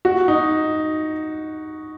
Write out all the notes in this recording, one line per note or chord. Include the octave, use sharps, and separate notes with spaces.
F#4
D#4